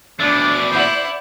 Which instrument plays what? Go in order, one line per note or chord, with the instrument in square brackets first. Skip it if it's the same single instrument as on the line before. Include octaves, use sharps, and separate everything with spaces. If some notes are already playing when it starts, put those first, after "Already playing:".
[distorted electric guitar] B2 A3 [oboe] D4 [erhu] D5
[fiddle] E4 F#5 [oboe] C5